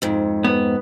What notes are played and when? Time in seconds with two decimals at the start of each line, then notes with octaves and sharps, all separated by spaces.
0.02 F2 G#2
0.44 B3